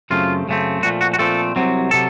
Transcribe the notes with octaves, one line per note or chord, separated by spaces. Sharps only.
F#2 C#3 A3 C4 F4
F#2 C#3 A3 C4
A#2 F3 A3 C4 F#4
F#4
F#4
A#2 F3 A3 C4 A4
C2 C3 F#3 C4
C3 F#3 A4